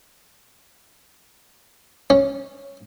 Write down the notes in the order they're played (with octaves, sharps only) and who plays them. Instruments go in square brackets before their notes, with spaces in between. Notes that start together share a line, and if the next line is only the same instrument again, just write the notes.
[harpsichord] C#4